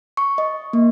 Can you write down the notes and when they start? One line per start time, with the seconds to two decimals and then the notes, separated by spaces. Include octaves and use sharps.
0.17 C#6
0.38 D#5
0.73 A#3